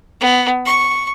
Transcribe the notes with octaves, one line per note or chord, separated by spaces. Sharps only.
B3
C#6